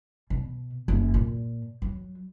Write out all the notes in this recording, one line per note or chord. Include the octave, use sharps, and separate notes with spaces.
B2
F#1
A#2
F#3